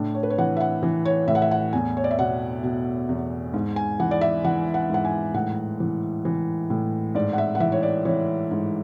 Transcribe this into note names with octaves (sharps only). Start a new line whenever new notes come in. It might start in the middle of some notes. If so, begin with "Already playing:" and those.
Already playing: A2 D4
C#5
B4
C#5
E3 F#5
E5
F#5
E3
C#5
A2 E5
F#5
E5
F#5
E2 G#5
C#5
D5
E5
B2 F#5
B2
E2
G#2
G#5
E3 F#5
D5
E5
E3 F#5
F#5
G#2 F#5
G#5
A2 F#5
E3
E3
A2
G#2 D5
F#5
E5
F#5
E3 E5
C#5
D5
E3 C#5
G#2